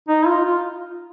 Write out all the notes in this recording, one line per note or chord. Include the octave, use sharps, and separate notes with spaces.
D#4
F4
F4